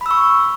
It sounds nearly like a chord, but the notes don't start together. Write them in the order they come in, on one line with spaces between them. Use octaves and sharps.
B5 E6 C#6